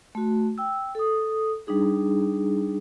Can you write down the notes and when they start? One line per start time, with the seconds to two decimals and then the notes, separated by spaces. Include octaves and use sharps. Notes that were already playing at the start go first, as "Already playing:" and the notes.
0.15 A3 F#4
0.58 G5 E6
0.95 A4 D#6
1.67 G3 D4 D#4 G#4